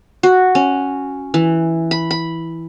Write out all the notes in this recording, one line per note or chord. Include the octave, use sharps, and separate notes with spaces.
F#4
C#4
E3
B5
B5